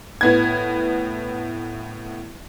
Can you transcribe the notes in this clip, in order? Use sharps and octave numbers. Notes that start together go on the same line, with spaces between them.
A2 B3 G#6